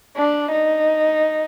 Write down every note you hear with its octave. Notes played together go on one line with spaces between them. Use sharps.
D4
D#4